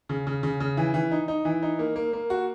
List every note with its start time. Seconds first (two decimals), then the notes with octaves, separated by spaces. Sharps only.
0.09 C#3
0.27 C#3
0.43 C#3
0.60 C#3
0.77 E3
0.94 E3
1.11 D#4
1.28 D#4
1.45 E3
1.63 D#4
1.79 A#3
1.96 A#3
2.13 A#3
2.30 F#4